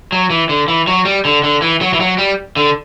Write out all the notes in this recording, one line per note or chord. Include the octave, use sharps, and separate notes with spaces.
F#3
E3
D3
E3
F#3
G3
D3
D3
E3
F#3
E3
F#3
G3
D3